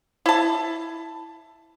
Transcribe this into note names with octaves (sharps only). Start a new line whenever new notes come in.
E4 A5